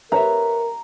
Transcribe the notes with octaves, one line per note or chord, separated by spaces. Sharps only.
A#4 B4 C#5 E5 A#5